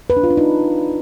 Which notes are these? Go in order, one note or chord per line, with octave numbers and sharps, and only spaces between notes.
B4
D4
F4
D4
D#4